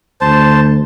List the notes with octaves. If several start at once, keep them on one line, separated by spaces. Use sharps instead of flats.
D2 C5 A5